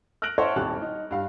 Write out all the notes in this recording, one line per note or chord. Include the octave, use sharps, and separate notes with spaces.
F6 F#6 A#6 D7 F#7
C5 C#5 E5 F#5 A5 C6
D#1 G#1 G4 A5 C#6 F#6
D#4
G2 F5